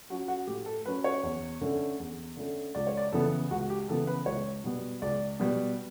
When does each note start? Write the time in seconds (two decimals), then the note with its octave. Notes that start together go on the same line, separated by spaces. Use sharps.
0.10 F#3 C#4 F#4
0.28 F#4
0.47 A2 G4
0.66 A4
0.86 F#3 C#4 B4
1.04 C#5
1.23 E2
1.61 D3 A3 C#4
2.00 E2
2.37 D3 A3 C#4
2.75 C#2 D5
2.87 C#5
2.97 D5
3.12 C#3 E3 B3 A4
3.51 C#2 F#4
3.70 G4
3.88 C#3 E3 B3 A4
4.07 B4
4.26 C#2 C#5
4.64 B2 G3 B3
5.02 C#2 D5
5.40 B2 G3 B3